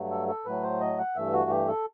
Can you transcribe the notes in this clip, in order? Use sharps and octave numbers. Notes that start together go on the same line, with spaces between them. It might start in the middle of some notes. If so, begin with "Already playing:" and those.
Already playing: G2 F#3 A3
A4
A4
A2 F#3 A3 B4
C5
D#5
F#5
G2 E3 A3 E5
F#4
G4
A4